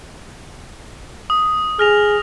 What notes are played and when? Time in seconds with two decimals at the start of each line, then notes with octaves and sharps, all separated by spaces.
1.30 D#6
1.79 G#4 F6 A#6 F7